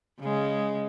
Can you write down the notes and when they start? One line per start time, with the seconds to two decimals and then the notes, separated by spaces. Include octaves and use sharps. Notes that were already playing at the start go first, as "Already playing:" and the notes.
0.20 C#3 G#3